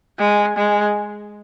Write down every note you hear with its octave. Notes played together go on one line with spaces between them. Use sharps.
G#3
G#3